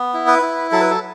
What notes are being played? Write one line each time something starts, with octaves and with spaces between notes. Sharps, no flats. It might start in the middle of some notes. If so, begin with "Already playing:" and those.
Already playing: B3
E4
B4
E4
F#3 A4
B4
A4